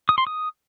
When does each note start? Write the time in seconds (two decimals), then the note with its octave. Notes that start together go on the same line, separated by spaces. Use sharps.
0.09 D#6
0.18 C6
0.27 D#6